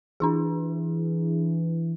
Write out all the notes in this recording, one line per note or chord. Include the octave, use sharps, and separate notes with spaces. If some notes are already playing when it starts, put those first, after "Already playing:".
E3 D4 E4 G#4